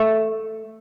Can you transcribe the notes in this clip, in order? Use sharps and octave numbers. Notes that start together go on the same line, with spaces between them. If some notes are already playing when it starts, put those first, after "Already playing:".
Already playing: A3